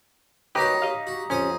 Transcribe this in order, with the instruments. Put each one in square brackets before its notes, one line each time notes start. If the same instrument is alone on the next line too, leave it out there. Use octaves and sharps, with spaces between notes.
[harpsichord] A#3 C#4 F#4 [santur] D#4 [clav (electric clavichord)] G4 B4
[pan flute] G4 [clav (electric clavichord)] D#5 F5
[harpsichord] F#4
[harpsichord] F2 C5 D#6 [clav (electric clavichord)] C#4